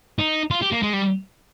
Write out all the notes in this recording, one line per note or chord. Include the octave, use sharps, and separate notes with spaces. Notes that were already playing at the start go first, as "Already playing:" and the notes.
D#4
F4
G4
A#3
G#3
G3